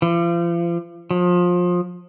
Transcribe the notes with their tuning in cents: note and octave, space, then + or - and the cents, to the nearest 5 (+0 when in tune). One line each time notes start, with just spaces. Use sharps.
F3 -40
F3 +25